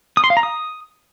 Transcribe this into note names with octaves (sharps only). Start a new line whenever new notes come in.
D#6
C6
F5
A#5
D#6